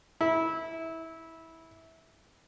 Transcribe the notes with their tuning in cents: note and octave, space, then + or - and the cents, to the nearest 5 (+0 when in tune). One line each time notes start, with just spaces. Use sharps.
E4 -20